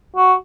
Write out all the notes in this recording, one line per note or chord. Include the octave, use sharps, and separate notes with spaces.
F#4